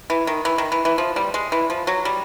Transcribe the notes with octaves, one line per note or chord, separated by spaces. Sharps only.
E3
D#3
E3
D#3
E3
E3
F3
G3
G#3
E3
F3
F#3
G3